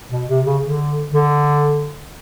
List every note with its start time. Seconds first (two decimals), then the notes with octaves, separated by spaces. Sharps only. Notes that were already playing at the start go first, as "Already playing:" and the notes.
0.12 B2
0.29 C3
0.45 C#3
0.62 D3
1.12 D3